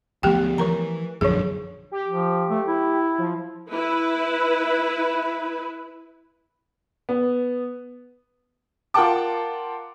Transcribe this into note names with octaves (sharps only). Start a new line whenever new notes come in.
D2 F3 A3 B3 G4 G5
E3 F3 A#4 A#5
A#1 F#2 D3 F3 G#4
G4
F3
A3
E4
F3
E4 B4
B3
F4 A#4 F#5 G5 A5 D6